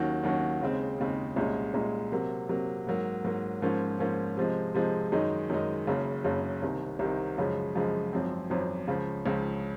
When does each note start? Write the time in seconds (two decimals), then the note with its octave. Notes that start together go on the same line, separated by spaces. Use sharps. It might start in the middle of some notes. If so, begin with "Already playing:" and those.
Already playing: D#2 D#3 F#3 C#4 F#4
0.23 D#2 D#3 F#3 C#4 F#4
0.61 D#2 C#3 G#3 C4
0.98 D#2 C#3 G#3 C4
1.36 C2 A#2 G#3 C#4
1.74 C2 A#2 G#3 C#4
2.12 C3 F#3 A#3
2.49 C3 F#3 A#3
2.87 G#2 F#3 A#3
3.24 G#2 F#3 A#3
3.62 G#2 F3 A#3 C#4
3.99 G#2 F3 A#3 C#4
4.37 C3 F3 G#3
4.74 C3 F3 G#3
5.12 F#2 D#3 G#3 D#4
5.50 F#2 D#3 G#3 D#4
5.87 F#1 F#2 C#3
6.24 F#1 F#2 C#3
6.62 C2 C3 D#3
6.99 C2 C3 D#3
7.38 F#2 C#3 F3 G#3
7.75 F#2 C#3 F3 G#3
8.13 G#1 F#2 F3 C4
8.50 G#1 F#2 F3 C4
8.88 C#2 C#3 F3
9.26 C#2 C#3 F3